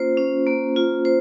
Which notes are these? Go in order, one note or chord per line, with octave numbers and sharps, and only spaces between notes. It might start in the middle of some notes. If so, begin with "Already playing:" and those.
Already playing: A#3 C#4 F4 C5
C#4
A#3
F4
C5